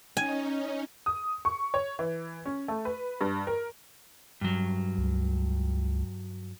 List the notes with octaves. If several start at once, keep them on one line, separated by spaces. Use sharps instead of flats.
C#4 D#4 G#5
D#6
C#6
C#5
E3
C#4
A3
B4
G2
A#4
G2 F#3
C#2